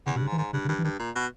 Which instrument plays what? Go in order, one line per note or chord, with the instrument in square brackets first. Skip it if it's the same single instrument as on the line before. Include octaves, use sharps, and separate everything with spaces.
[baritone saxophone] E2 [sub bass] C#3
[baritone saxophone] G2 [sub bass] B2
[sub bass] C#3
[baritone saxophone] G#2
[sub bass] E3
[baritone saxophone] G#2 [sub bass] D#3
[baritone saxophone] G2 [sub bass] C#3
[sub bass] C#3
[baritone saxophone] G2 [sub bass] D#3
[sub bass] E3
[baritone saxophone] G2 [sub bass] D#3
[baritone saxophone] A#2
B2